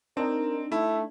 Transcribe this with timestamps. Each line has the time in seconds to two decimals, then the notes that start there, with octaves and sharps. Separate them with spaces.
0.17 C4 D4 D#4 A#4
0.72 A3 E4